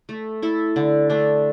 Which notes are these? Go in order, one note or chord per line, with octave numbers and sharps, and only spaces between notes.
A3
E4 A4
D3
A3 D4